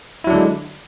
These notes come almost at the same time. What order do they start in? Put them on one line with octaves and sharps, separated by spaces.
E4 F#3 D4 D3 G#3